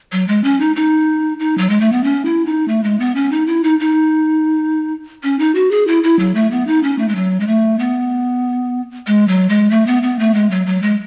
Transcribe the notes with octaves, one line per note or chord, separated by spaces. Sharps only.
F#3
G#3
C#4
D#4
D#4
D#4
F#3
G#3
A3
B3
C#4
E4
D#4
A3
G#3
B3
C#4
D#4
E4
D#4
D#4
C#4
D#4
F#4
G#4
E4
E4
F#3
A3
B3
D#4
C#4
A3
G#3
F#3
G#3
A3
B3
G#3
F#3
G#3
A3
B3
B3
A3
G#3
F#3
F#3
G#3